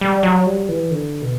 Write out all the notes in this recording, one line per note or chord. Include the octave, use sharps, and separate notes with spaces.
G3
F#3
G3
E3
D3
B2